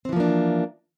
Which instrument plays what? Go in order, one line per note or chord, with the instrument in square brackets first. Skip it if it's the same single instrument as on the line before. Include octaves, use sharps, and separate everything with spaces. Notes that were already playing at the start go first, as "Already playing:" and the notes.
[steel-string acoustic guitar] C4
E3
F3
A#3
D4